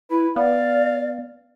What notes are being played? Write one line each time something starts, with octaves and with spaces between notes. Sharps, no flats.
E4 B4
B3 D5 F5